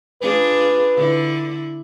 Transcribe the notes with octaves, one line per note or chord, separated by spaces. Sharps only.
D4 F4 G#4 B4
D3 E4